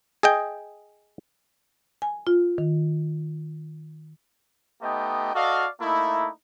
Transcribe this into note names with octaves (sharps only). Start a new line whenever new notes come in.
G#4 D#5 G5
G#5
F4
D#3
A3 B3 D#4 G4 D#5 G5
F#4 A4 D5 D#5 F5
A3 A#3 D#4 E4